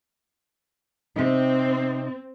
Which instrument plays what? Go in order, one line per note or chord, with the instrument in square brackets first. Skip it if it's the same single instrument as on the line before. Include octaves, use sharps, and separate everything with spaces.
[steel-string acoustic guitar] C3 D#4 [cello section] C4